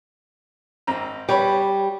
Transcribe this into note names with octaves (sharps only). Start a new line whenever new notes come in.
G#1 C4 A#5
G3 B4 C#5 B5